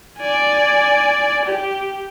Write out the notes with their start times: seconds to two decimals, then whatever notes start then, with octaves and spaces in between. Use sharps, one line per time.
0.19 D5 G#5
1.45 G4